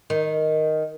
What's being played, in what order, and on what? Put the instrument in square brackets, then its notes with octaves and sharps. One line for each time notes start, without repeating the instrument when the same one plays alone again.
[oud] D#3